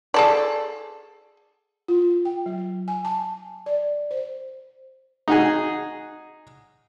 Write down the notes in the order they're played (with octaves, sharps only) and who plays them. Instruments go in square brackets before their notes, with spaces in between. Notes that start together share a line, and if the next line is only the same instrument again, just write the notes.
[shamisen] G#4 A4 D5
[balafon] F4
G5
F#3
G#5
A5
D5
C5
[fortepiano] D#4 F#4 G#4